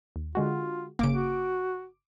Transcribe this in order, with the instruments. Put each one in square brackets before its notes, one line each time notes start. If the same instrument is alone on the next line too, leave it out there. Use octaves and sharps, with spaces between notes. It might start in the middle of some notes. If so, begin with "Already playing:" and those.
[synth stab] D#2
[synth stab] D3 G#3 F#4 [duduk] F4
[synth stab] G1 D6 D7 [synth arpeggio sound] C#3 A#3
[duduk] F#4